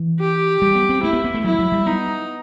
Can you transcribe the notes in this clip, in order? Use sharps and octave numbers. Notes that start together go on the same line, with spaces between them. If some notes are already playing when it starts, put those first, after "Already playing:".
Already playing: E3
G4
G3
B3
C4
A3 E4
B3
B3
A3
F#3 E4
F#3
G3
B3 D#4